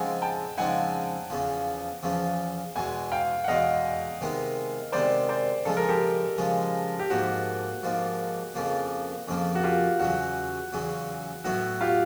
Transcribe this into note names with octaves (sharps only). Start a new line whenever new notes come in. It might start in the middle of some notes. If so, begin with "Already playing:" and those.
Already playing: C#3 F3 G#3 C4 D#4 F#5 G#5
G5 A5
C#3 F3 G#3 C4 D#4 F#5 G#5
E2 C#3 F3
E2 C#3 F3
E2 B2 G#3 F#5 G#5
F5 G5
F#5
E2 B2 G#3 D#5 F5
C3 D#3 G#3 B3
C3 D#3 G#3 B3 C5 D5
C5 D5
C#3 F3 G#3 A4
A#4
G4 A4
C#3 F3 G#3
G4
G#2 F3 A#3 F#4
G#2 F3 A#3
F2 C#3 F3 A#3
F2 C#3 F3 A#3
F#4
F4 G4
E2 C#3 F#3 F#4
E2 C#3 F#3
A2 F#3 B3 E4 F#4
F4 G4